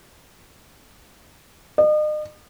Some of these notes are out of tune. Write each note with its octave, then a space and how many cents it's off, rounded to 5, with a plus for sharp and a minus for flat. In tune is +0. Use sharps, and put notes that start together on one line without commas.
D#5 -40